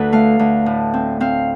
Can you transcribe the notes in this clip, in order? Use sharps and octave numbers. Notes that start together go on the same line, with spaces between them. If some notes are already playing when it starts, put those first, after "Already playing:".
Already playing: D2 A4 B4
A3 F5
D2
A2
C4
C4 F5